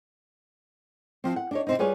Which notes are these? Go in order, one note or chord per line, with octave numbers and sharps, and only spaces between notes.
F3 C4
F#5
D4 D#4 C#5
C3 C4 D#4
G3 F4 G#4 B4 C#5